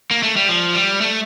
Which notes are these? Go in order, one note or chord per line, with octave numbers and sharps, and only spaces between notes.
A#3
A3
G3
F3
G3
A3